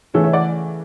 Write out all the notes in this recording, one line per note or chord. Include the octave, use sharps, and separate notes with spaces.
C#3 E3 A3 A4 C#5
C#5 E5
D5 F#5